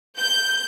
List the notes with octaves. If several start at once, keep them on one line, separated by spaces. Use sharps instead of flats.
G6